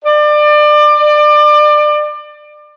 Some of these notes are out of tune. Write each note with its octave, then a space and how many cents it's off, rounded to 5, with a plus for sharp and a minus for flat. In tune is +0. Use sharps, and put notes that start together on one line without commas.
D5 +30